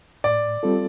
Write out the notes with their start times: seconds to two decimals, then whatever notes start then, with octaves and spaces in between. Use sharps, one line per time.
0.24 A2 D5
0.63 G3 C4 F4 A4